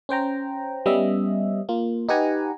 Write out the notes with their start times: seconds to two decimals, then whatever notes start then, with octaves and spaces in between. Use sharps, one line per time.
0.09 C#4 C5 G5 A#5
0.86 G3 B3 C#4 D#5 E5
1.69 A#3 F4
2.09 D#4 G4 B4 F#5 G#5 A#5